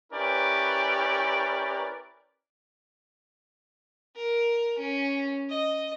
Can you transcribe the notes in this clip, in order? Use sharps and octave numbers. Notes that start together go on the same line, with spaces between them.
C#4 E4 G4 A#4 B4 D5
A#4
C#4
D#5